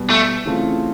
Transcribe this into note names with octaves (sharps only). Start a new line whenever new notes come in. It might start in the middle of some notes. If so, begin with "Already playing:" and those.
Already playing: B2 G3 B3
A3
C#3 E3 A3 C4 F4